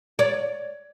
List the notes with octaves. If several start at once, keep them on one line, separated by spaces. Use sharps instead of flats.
C#5 D5